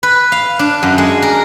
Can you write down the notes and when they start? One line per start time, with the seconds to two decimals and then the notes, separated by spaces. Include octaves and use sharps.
0.03 B4
0.32 F5
0.59 D4
0.83 F#2
0.98 G#3
1.22 A#4